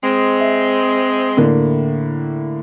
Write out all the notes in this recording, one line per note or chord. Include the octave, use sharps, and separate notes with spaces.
G#3 C4
E5
A2 D3 A#3